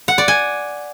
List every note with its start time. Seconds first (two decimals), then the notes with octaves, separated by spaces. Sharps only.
0.08 F#5
0.18 D5
0.28 G#5